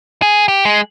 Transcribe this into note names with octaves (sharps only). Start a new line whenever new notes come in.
G#4
G4
G#3